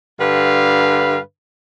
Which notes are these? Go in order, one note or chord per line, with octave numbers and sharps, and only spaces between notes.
G2 D3 B4 F5